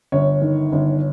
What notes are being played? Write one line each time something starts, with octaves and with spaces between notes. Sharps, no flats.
G1 C#5
D#3
G1